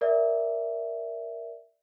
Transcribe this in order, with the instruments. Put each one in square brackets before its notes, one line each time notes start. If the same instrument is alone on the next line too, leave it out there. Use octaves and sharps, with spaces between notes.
[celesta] A#4 D5 E5